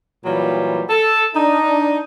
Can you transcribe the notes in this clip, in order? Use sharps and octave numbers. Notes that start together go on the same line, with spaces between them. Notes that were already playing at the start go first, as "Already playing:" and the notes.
A#2 E3 F#3 G3
A4
D4 D#4